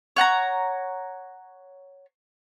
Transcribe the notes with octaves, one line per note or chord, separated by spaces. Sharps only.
C#5 F#5 A5 A#5